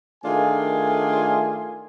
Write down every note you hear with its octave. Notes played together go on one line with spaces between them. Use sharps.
D#3 A3 D4 F4 G#4 G#5